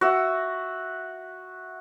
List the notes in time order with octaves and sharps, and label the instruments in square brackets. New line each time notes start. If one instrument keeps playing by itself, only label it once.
[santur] F#4 E5